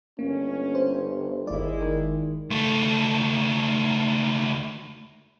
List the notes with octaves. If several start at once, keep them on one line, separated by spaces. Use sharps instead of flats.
G1 A#3 C#4
C5
G1 D#2 G#3 E4 D5
D#3
C#2 A3